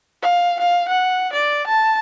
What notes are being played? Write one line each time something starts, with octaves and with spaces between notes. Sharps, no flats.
F5
F5
F#5
D5
A5